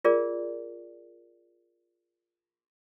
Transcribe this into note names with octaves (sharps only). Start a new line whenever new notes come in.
F4 G#4 A#4 D5